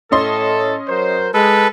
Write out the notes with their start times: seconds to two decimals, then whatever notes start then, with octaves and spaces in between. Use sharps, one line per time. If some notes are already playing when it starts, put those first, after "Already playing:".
0.12 A2 C#4 A4 D#5 C6
0.88 F#3 A#4 C5
1.34 G#3 A4 B4